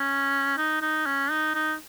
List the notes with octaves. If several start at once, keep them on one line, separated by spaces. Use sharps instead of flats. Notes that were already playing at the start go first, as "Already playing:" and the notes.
Already playing: C#4
D#4
D#4
C#4
D#4
D#4